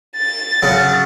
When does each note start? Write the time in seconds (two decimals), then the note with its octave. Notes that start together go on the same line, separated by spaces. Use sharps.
0.16 A6
0.63 C#3 F#3